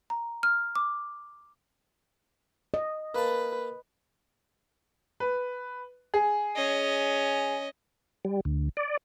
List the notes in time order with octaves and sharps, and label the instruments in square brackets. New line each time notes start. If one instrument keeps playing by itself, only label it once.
[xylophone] A#5
F6
D6
[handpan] D#5
[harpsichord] A#3 A5 [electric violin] B4
[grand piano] B4
G#4
[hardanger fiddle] C#4 D#5
[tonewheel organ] G3
D2
D5